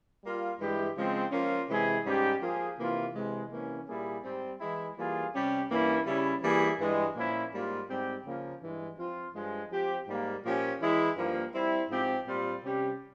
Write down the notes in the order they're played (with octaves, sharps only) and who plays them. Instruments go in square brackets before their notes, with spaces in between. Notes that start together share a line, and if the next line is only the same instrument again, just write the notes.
[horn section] G3 A#3 F4
G2 E3 G#3 E4 G4
C#3 F3 G#3 C4
F3 A#3 C#4 F4
C3 E3 G#3 E4 G#4
G#2 G3 C#4 G4
F3 A#3 F4 G#4
C3 E3 A#3 F4
C3 E3 G#3
C3 E3 A#3 C#4
A#2 G3 A#3 E4 G#4
G#2 G3 C4
E3 G#3 E4
E3 G3 A#3 F4 G#4
C3 G3 C#4 G4
G2 E3 A#3 C#4 E4
C#3 G3 C#4 E4
E3 G3 A#3 E4 G#4
G2 E3 G#3
A#2 F3 A#3 C#4 E4
G#2 G3 A#3 F4
G#2 G3 C4 G4
C#3 F3 A#3
G2 E3 G#3
F3 C4 F4
G2 F3 G#3
F3 C4 G4
G#2 G3 A#3
A#2 F3 A#3 C#4 G4
E3 G#3 E4
G2 F3 A#3
G3 C4 E4
G#2 F3 C4 G4
A#2 G3 C4 F4
C3 G3 C#4 G4